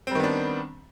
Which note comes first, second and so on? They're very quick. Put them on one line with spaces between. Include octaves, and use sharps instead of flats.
C4 G3 D#3 B3 D4